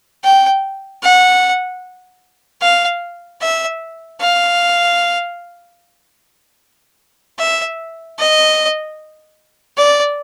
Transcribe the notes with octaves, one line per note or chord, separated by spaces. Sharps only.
G5
F#5
F5
E5
F5
E5
D#5
D5